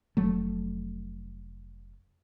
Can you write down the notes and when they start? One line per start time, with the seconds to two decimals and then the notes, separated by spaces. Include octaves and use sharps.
0.17 F1 F#3 A3